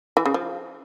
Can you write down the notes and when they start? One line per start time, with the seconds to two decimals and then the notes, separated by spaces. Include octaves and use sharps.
0.17 E3
0.26 C#3
0.34 F3